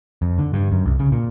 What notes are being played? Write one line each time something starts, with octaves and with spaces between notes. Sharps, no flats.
F2
D3
G2
F#2
C2
C#3
A#2